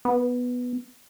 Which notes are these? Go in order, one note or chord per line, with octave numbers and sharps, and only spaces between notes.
B3